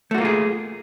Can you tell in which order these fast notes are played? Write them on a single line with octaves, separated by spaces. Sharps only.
A3 F#4 A#3 F4 G#4